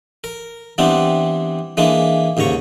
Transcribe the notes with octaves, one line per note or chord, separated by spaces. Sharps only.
A#4
E3 G3 B3 C4 D4
E3 G#3 A#3 D4
D#2 G#2 C#3 A#5 C#6